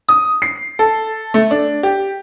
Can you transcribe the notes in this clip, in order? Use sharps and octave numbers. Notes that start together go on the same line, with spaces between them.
D#6
C7
A4
A3
D4
G4